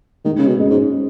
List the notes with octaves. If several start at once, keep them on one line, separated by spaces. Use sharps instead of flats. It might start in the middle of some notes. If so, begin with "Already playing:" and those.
D#3 G#3
C#3
B2
C#4 G#4 D#5
G#2